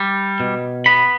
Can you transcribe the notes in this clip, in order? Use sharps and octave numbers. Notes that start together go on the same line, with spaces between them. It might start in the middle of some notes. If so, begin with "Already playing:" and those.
Already playing: G3
B2
B3 B5